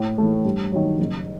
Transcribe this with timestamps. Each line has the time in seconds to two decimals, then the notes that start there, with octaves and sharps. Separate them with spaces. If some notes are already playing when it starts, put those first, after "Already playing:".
Already playing: A2
0.18 E3 A3
0.45 G2
0.72 D#3 F#3
0.99 F#1